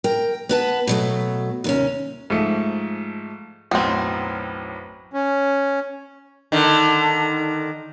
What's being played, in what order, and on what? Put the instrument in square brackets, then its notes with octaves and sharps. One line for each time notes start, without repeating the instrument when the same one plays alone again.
[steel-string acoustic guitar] A#4 G5
B3 B4 A5
B2 F#3 A3
D#2 C3 C#4
[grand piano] G#2 F3 A3
[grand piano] B1 F#2 A2 [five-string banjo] B3 C4
[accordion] C#4
[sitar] D3 D#3